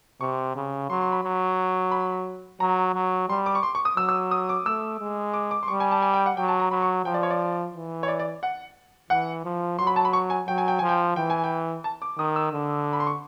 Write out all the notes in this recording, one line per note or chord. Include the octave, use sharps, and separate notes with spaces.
C3 C#6
C#3
F#3 C6
C6
B5
F#3
B5
F#3 A#5
F#3
G3 C6
D6
C#6
C6
C#6
D#6
F#3 E6
E6
D#6
D6
A3 E6
G#3
D6
D6
C6
G3 C#6
G#5
A5
G#5
G5
F#5
F#3 G5
A5
A#5
F#3 B5
C#6
F3 G5
D5
C#5
D5
E3
C#5
D5
D5
F#5
E3 F#5
F3
F#3 C6
B5
A5
B5
C#6
G#5
F#3 G5
G#5
G5
F3 G#5
G5
E3 G5
G#5
G5
A5
D6
D#3 D#6
E6
D3
B5
C6
C#6